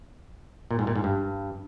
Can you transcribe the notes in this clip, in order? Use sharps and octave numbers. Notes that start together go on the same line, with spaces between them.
A#2
G#2
A#2
G#2
G2